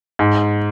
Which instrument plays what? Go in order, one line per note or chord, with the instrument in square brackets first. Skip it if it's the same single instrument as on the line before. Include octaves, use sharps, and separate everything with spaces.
[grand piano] G#2